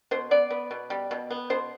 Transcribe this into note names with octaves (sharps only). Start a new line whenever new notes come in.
B2 C5
B3 D5
B3
B2
G3
B2
B3
B2 C5